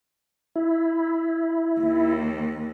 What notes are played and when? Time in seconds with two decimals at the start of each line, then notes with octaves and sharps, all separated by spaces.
0.56 E4
1.81 D#2